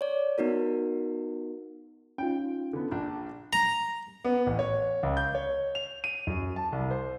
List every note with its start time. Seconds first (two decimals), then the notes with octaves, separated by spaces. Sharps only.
0.01 C#5 D5
0.38 B3 D#4 F#4 A#4
2.18 C#4 D#4 F4 G5
2.73 D3 B3
2.91 A#1 D4
3.53 A#5
4.25 B3
4.47 A1
4.59 C#5
5.03 C#2
5.17 G6
5.35 C#5
5.75 F7
6.04 D#7
6.27 F#2
6.56 A5
6.72 C2
6.91 C5